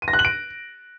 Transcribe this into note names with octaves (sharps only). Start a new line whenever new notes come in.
D#7
A#6
F#6
F#7
D7